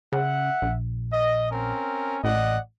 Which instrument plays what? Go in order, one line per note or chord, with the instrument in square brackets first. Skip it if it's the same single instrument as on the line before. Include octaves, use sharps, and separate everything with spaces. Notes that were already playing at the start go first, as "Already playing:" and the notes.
[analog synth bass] C#3 [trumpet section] E5 F#5
[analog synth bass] A#1
[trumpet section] D#5
C4 C#4 A#4
[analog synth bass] A1 [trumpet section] D5 D#5 F#5